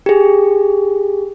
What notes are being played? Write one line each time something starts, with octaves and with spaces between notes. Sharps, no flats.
G4 G#4